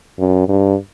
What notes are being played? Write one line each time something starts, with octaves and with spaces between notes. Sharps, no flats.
F#2
G2